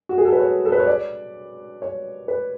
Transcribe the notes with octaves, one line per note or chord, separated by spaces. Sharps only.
F#4
G#4
A4
B4
C#5
A4
B4
C#5
D5
C#5
B4